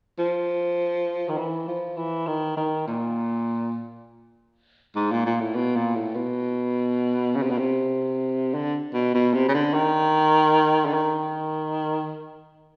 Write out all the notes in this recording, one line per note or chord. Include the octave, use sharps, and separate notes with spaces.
F3
D#3
E3
F3
E3
D#3
D#3
A#2
G#2
A#2
A#2
A2
B2
A#2
A2
B2
C#3
C3
B2
C3
D3
B2
B2
C3
C#3
D3
D#3
D3
D#3